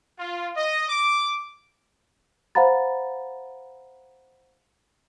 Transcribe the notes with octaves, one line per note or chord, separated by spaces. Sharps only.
F4
D#5
D6
C5 F5 F#5 A#5 B5 A6